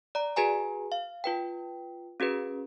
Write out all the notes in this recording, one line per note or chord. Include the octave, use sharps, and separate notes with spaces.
D5 A#5
F#4 G#4 B4 G#5 A#5
F5
F4 B4 G5
C#4 F#4 G#4 B4